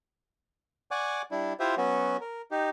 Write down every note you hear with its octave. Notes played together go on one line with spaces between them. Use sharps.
D5 F#5 G#5 C#6 D6
G3 D4 E4
E4 F4 G4 C5 E5
F#3 B3 C#4 F#4
A#4
D#4 G4